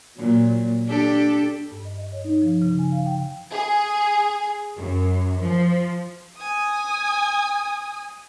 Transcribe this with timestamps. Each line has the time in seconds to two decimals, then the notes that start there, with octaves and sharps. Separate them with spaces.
0.17 A#2 F#3
0.87 D4 G4 A4
1.71 G2
1.85 D#5
1.98 D#5
2.12 C#5
2.25 D#4
2.42 F3
2.62 C#3
2.79 G#5
2.92 F5
3.06 G5
3.53 G#4
4.77 F#2
5.40 F3
6.36 G#5 D#6